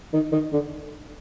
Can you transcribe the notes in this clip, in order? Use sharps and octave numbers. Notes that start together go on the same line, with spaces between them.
D#3
D#3
D3